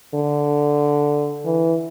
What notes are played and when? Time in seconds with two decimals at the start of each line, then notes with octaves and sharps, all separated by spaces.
0.14 D3
1.45 E3